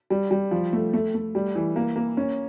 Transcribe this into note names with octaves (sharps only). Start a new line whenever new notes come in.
G3
G3
F3
A3
A3
A3
G3
E3
A#3
A#3
C#4